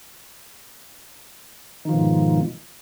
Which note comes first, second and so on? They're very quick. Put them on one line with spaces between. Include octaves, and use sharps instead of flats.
D#3 F3 B2 G#2